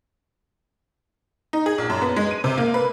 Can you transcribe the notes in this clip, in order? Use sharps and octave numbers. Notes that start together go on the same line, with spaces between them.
D#4
G#4
A#1
F#2
B3
G#3
D#7
C3
A#3
B4